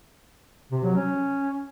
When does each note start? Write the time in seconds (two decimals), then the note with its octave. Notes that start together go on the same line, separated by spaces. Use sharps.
0.71 C3
0.83 F#3
0.95 C#4